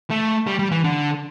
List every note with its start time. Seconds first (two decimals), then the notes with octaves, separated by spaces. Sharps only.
0.10 A3
0.47 G3
0.59 G3
0.72 E3
0.84 D3